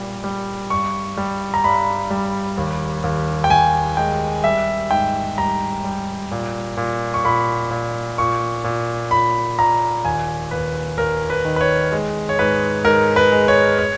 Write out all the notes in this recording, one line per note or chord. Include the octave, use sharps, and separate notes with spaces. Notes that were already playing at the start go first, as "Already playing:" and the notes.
Already playing: A#2 G3
G3
G2 C#6
G3
A#5
G2 B5
G3
D#2
D#2
G5
D#2 G#5
G#3 G5
G3 E5
G#2 G5
G3 A#5
G3
A#2
A#2
C#6
A#2 B5
A#2
A#2 C#6
A#2
A#2 B5
A#2 A#5
D#2 G#5
D#2 B4
D#2 A#4
B4
D#3
B4
C#5
G#3
C#5
G#2 B4
G#2 A#4
B4
G#3
C#5
C#5